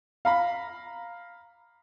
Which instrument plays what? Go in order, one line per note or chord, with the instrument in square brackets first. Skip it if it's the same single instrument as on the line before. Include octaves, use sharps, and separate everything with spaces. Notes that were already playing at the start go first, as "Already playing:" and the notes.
[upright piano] F5 A#5 B5